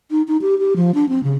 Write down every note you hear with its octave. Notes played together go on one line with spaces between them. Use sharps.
D#4
D#4
G4
G4
F3
D4
C4
C#3